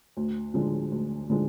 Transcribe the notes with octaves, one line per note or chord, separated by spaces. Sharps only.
D2
D3 F3 G#3
D2
D3 F3 G#3